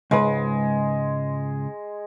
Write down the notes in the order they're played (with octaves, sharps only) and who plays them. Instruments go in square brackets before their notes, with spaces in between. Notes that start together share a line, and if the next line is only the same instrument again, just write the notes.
[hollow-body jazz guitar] C#2 G#2 B4 [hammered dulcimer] G#3